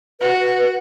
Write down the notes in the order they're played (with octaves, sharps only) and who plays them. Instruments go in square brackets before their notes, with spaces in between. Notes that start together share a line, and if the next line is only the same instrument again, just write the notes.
[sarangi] F#4 [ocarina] B4